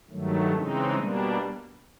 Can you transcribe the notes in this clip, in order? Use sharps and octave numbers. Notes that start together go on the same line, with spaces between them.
G2 D#3 F#3 A3
C#3 E3 G#3 C4 D#4
B2 G3 A#3 D4